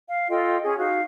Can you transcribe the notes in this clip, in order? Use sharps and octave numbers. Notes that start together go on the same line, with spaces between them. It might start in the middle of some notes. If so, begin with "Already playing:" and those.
F5
F4 A4 D#5 G5
C#4 G#4
D#4 F#4 F5